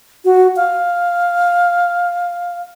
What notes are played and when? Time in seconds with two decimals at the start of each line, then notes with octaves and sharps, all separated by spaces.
0.25 F#4
0.56 F5